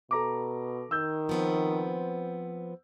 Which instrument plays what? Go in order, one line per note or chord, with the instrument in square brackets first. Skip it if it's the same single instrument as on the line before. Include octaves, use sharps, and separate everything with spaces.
[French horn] B2 [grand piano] A4 A#5 D6
[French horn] D#3 [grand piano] E6 G6
[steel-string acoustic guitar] F3 B3 C4